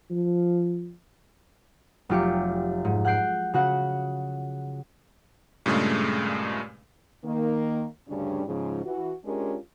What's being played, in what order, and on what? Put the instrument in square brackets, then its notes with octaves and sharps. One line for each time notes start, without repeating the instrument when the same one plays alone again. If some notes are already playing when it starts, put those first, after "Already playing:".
[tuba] F3
[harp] F1 F#3 F4 G4 D6 C#7
G#2
F#5 F#6 G6 C7 D7
C#3 F#4 F#5
[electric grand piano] G2 A#2 C#3 G#3 A3
[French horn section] D#3 A#3
D2 G2 C#3 G3 C#4 D4
G#2 C#3 F3
E3 F#4
G#3 C#4 D4 F4 G4 A#4